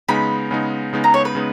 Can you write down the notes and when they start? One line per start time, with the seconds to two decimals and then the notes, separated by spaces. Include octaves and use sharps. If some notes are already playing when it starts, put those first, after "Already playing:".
0.09 C#3 G#3 B3 D#4 B5
0.51 C#3 G#3 B3 D#4
0.93 C#3 G#3 B3 D#4
1.04 A#5
1.14 C#5
1.25 B4
1.35 C#3 G#3 B3 D#4